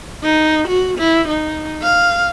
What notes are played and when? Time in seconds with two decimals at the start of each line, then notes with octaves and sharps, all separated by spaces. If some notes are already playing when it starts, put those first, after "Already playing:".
0.23 D#4
0.68 F#4
0.98 E4
1.28 D#4
1.83 F5